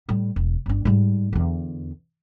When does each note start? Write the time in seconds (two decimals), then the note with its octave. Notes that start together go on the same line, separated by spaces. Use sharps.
0.09 A2 G3
0.36 E1
0.66 G1 D4
0.85 G#2 G3
1.33 E2 D3